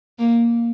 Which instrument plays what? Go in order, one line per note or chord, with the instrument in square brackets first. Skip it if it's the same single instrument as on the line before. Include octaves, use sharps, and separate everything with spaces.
[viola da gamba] A#3